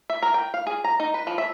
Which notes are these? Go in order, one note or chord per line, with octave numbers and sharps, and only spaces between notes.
E5
A#4
G5
F5
G#4
A#5
D#4
B4
F3
E5